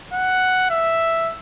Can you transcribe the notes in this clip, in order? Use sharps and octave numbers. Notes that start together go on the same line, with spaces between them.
F#5
E5